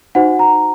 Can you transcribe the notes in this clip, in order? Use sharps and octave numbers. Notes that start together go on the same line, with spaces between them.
D#4 F#4 C5 F#5
A#5